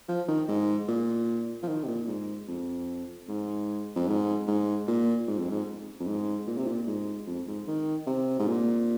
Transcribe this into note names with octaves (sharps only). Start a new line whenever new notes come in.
F3
D#3
G#2
A#2
F3
D#3
C3
A#2
G#2
F2
G#2
F2
G#2
G#2
A#2
G#2
F2
G#2
F2
G#2
A#2
C3
A#2
G#2
F2
G#2
D#3
C3
G#2
A#2